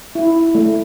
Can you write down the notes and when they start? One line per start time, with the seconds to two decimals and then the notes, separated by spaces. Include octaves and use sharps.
0.15 E4
0.55 A3